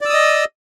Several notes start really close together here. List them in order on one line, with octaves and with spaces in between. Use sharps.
D5 E6 D#6 D#5